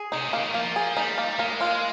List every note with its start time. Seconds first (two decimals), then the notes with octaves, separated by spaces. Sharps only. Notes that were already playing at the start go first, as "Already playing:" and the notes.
Already playing: G#4
0.12 C3 D#4
0.28 C#3
0.33 A#3
0.41 D#3
0.54 F3 A#3
0.76 G#4
0.97 G3 D#4
1.18 A#3
1.39 G#3 A#3
1.61 F4